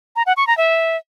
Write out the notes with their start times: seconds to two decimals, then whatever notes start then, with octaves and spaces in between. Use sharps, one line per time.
0.16 A#5
0.26 F#5
0.37 C#6
0.47 A#5
0.58 E5